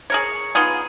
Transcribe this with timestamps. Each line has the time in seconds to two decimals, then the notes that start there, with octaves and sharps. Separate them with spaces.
0.10 G#4 A#4 C#5
0.55 B3 D#4 F4 G#4